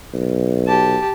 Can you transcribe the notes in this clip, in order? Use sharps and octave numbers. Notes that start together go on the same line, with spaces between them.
B1
G4 A5